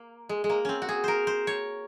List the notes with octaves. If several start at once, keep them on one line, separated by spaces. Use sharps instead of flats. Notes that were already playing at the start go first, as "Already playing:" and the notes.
Already playing: A#3
G#3
G#3
A#3
C4 C#4
F#4
G#4
A#4 C5
C5
C#5